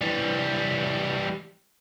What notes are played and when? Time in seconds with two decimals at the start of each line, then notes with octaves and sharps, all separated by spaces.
0.01 E3 G3